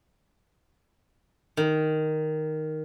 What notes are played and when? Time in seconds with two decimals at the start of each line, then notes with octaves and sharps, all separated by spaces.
1.57 D#3